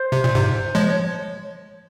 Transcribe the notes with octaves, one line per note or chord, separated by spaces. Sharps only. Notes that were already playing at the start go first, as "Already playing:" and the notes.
Already playing: C5
C3
A#2
G#2 C3
F3 G#3 C#5
C#5